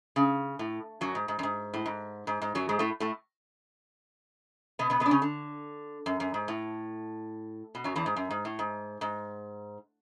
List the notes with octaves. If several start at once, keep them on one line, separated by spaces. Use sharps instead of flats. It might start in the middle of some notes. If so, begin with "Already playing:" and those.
C#3
A2
F#2 F#3
G#2
G#2
F#2
G#2
A2
G#2
G#2
G#2
F#2 F#3
G#2 G#3
A2 A3
A2 A3
B2 B3
B2 B3
B2 B3
D4
C#3 C#4
D3
F#2
F#2
G#2
A2
B2
F#2 F#3
E2 E3
G#2
F#2
G#2
A2
G#2
G#2